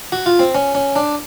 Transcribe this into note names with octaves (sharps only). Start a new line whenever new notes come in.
F#4
F4
C4
C#4
C#4
D4